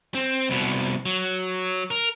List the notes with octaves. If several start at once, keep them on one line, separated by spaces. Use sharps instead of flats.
C4
C2 B2
F#3
A#4